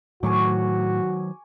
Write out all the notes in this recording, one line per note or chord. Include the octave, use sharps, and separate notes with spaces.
A2 D#3 F#3 F#4 G#5 C#6 D6